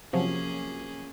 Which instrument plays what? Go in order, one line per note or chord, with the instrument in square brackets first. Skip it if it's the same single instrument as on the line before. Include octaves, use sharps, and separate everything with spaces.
[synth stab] C3 F3 F#3 [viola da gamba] A#3 C#4 G#4